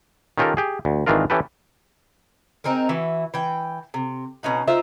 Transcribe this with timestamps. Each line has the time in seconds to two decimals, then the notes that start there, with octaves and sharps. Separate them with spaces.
0.38 D#3 C#4 F4 G4 A4 A#4
0.57 G4 G#4
0.85 D2
1.06 G#1 D#3 E3 D4 F4 A#4
1.30 E3 C#4 G4 A4 B4
2.64 C4 D#4 G#4 A#4
2.89 E3 E4 F#4
3.34 E3 G5
3.94 C3
4.43 B2 C#4 D#4 F#5
4.68 D#4 F4 C5 E5